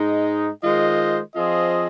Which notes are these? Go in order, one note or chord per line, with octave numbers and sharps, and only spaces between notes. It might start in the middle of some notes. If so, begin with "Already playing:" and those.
Already playing: G#2 G#3 D#4
D#3 G#3 F4 C5 D#5
F3 C4 F4 G#4 D#5